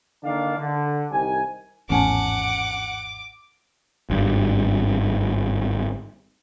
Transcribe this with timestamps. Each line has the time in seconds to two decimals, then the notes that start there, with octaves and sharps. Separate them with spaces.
0.23 D3 D#3 A#3 D4 D5 F5
0.58 D3
1.12 C2 D#3 G4 G#5
1.90 G#1 E2 A2 C#4 F#5 G#5 A5 D6
4.10 G#1 G2